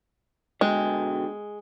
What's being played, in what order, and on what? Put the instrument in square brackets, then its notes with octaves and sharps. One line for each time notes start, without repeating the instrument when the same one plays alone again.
[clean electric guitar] B2 D3 G5 [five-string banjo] G#3